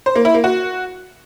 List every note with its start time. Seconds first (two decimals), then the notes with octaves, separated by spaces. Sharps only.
0.06 C5
0.16 A#3
0.25 E4
0.34 A#3
0.44 F#4